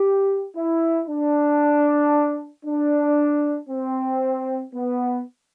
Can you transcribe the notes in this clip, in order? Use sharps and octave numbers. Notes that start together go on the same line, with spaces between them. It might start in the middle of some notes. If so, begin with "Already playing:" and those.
Already playing: G4
E4
D4
D4
C4
B3